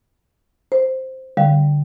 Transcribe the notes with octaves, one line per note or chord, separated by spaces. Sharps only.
C5
D3 G3 F5